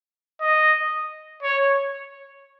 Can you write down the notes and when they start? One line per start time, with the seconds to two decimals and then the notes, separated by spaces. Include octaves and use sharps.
0.41 D#5
1.43 C#5